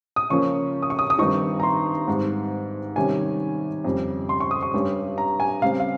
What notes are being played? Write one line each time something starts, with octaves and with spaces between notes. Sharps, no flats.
D#6
C#3 F3 A#3 C#4 C#6
D#6
C#6
D#6
D#6
G2 D#3 G3 C4 D#4 C#6
A#5
C6
G#2 G3 C4
C3 D#3 G3 C#4 G#5
F2 C#3 G3
C6
C#6
D#6
C#6
G2 G3 C#4
A#5
G#5
C#3 G3 C4 F5
F5